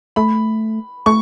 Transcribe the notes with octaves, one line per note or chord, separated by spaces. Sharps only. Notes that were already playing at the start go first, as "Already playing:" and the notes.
A3 B5
A3 C#6